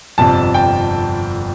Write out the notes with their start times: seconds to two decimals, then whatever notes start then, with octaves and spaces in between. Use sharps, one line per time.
0.18 G1 F2 C3 F3 A5
0.54 G5